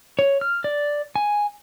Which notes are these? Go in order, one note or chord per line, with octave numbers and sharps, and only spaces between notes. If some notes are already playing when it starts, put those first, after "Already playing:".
C#5
F6
D5
G#5